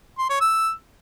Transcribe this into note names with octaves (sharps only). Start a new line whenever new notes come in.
C6
C#5
E6